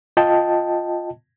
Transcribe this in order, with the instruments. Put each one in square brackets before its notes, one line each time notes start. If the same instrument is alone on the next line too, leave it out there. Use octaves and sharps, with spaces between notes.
[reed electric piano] F4 D#5 G5 A5